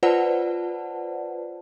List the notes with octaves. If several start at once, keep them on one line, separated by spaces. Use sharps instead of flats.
F4 B4 C5 D5 F#5 A5